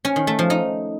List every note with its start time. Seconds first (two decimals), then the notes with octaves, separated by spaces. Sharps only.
0.05 C#4
0.16 D#3
0.27 A3
0.39 F3
0.50 D#4